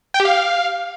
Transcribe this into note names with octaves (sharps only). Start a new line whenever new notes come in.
G5
G4
F5